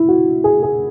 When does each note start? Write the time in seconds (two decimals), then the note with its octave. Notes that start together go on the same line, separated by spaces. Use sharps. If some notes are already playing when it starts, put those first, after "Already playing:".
Already playing: E4
0.08 F#4
0.44 G#4
0.63 G#4